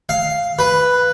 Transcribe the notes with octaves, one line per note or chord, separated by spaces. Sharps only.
F5
B4